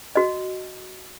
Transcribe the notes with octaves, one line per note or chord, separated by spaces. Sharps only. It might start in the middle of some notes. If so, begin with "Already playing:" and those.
F#4 D#5